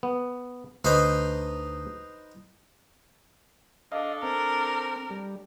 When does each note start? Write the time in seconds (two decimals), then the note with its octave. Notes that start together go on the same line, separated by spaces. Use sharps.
0.03 B3
0.84 D2 D#4 B4 C5
3.92 D4 A4 D#5 F5
4.23 C4 A#4
5.10 G3